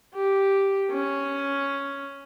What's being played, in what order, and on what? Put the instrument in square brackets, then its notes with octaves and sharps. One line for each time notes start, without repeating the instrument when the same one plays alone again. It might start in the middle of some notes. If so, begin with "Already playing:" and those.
[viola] G4
C#4